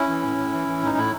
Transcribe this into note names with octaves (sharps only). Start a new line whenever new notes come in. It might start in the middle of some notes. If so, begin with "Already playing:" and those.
Already playing: C#4 E4
E3
A2
A2
E3
E3
A2 D#4
A2 E4